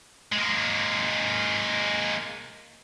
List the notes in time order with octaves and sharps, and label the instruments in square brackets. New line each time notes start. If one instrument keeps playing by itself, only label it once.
[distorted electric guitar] G#3 A#3